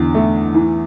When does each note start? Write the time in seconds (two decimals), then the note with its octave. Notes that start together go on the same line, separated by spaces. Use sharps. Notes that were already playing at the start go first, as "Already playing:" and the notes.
Already playing: E2 D3
0.15 A3
0.54 E3